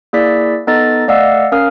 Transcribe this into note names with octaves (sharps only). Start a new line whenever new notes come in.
A#3 E4 G#4 D5 B6
B3 D#4 A4 D#5 A6
A3 D5 D#5 F5 F#5 E6
C#4 A#4 F5 D#6 F6